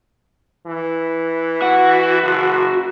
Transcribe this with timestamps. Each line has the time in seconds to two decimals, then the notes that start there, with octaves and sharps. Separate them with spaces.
0.66 E3
1.62 F#4
2.23 F#1